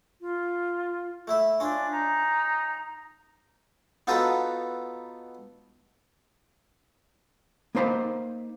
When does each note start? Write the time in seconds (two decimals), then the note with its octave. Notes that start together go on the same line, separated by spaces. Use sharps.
0.21 F4
1.28 A3 E4 E5
1.60 C#4 D4 F4
1.92 D#4 A#5
4.07 B3 D#4 F4 F#4 A4 B4
7.75 A#3 D#4 C5 A#5 B5